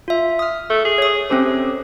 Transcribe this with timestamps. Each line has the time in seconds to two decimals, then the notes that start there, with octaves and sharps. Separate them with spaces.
0.08 F4 E5
0.39 D#6 F6
0.70 A3
0.85 G#4
0.98 C#5 D#6
1.30 C3 C4 C#4 A4